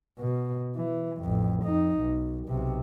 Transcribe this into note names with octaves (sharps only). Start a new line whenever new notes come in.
B2
E3
A1 F2
F2 D#4
B1
B1 C3